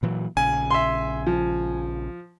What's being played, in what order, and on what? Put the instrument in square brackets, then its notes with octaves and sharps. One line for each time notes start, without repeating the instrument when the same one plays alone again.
[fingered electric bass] A#2 E3 F#3
[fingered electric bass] A#1 C#3 [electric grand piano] G#5
[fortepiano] E5 C6
F3